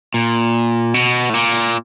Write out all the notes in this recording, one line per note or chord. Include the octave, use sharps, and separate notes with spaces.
A#2
B2
A2
A#2